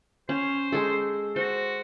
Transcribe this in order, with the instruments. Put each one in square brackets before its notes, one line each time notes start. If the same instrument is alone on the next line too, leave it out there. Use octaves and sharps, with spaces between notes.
[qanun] C#4 [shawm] C5
[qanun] G#3 G#4 A4
[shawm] F#4 [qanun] C5